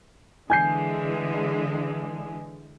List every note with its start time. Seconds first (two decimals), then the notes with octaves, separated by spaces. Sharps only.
0.50 D3 E3 G#3 G#5 G6 C7